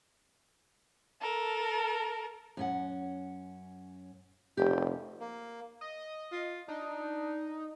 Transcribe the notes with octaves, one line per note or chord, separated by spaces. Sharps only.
A4 A#4
F#2 C#4 F#5
F1 G4
A#3
D#5
F4
D4 D#4